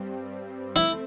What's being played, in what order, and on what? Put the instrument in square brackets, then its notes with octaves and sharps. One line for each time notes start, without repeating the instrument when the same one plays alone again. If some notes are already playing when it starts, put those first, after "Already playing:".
Already playing: [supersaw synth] G2 G3 C4
[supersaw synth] A3 C4 [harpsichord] E4